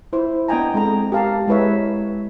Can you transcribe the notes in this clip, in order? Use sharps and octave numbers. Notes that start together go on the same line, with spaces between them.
E4 C5
B3 D4 D#5 G5 G#5 A#5
G#3 C4 A4 A#5
G4 A#4 F5 A5 A#5
G#3 E4 B4 C#5 E5